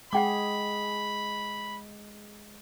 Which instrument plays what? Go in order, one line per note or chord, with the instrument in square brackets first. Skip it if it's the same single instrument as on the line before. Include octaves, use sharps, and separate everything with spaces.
[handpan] G#3 G#4 [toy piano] F#5 G5 D6 [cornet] B5